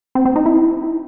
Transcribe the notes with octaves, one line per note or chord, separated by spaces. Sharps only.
C4
C4
D#4
E4